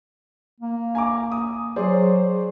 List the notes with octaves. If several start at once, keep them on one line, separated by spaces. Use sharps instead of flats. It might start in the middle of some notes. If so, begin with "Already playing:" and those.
A#3
G#5 A#5 D6
D#6
F#3 G#4 C5 D5